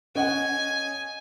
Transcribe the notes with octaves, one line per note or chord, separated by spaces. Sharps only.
C#4 D#5 F#5 G#5